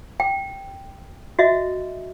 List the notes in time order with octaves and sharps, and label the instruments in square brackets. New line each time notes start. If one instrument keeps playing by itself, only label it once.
[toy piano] G5
F#4 D#5 E5